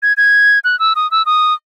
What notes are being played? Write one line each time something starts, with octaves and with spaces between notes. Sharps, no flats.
G#6
G#6
F#6
E6
D#6
E6
D#6